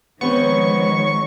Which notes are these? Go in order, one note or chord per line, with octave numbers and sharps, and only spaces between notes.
D#3 F3 G#3 B3 C4 C#5 C#6